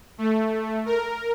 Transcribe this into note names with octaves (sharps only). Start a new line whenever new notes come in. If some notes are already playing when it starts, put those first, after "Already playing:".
A3
A#4